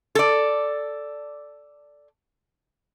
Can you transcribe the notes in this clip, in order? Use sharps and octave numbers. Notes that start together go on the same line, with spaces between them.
A4 D5